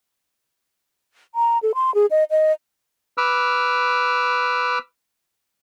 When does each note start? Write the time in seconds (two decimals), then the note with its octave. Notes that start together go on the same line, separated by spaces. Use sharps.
1.35 A#5
1.63 A4
1.75 C6
1.95 G#4
2.11 D#5
2.31 D#5
3.18 B4 D6 E6 F6